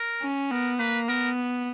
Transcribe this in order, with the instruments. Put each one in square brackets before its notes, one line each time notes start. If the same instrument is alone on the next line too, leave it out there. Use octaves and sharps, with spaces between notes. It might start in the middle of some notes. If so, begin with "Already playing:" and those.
Already playing: [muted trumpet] A#4
[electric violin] C#4
[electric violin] B3 [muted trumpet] A#4
[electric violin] A#3 [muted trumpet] B4
[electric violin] B3 [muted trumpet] A#4